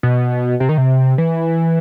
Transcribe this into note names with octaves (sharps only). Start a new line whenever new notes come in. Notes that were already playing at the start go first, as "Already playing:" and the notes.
B2
C3
D#3
C3
E3